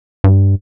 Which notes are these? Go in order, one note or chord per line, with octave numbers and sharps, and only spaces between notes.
G2